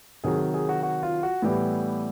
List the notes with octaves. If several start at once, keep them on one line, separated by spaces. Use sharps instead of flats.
C3 D#3 F#3 G#4
G#4
F#4
F#4
F4
F#4
A2 E3 G3 B3 G4